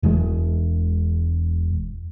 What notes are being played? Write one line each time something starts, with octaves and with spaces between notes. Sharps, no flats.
E1 E2 G#3